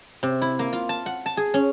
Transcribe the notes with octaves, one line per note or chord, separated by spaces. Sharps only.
C3
E4
A#3
F4
A5
F#5
A5
G#4
C#4